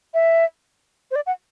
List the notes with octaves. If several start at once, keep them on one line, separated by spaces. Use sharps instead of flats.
E5
C5
D5
F#5